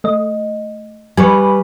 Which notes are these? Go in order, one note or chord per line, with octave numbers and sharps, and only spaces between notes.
A3 D#5
G3 B4 G#5 C#6